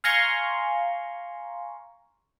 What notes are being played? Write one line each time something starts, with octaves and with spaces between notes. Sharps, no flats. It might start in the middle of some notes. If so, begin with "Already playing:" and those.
F5 G#5 A#5 C6 C#6